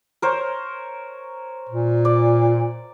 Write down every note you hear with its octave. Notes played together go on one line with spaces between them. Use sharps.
A#4 C5 C#5
A#2
D5